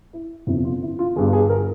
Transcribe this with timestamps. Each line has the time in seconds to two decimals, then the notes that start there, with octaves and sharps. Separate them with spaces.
0.13 E4
0.47 G1 F2 C3 E4
0.65 F4
0.82 E4
0.99 F4
1.16 G1 G2 G3 G#4
1.33 G#4
1.50 A#4